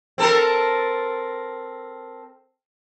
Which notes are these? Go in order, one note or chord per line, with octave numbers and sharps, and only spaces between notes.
C4 A4 A#4